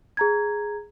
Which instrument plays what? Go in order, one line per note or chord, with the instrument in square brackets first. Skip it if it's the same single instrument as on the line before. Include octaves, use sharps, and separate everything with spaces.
[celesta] G#4 A#5 G#6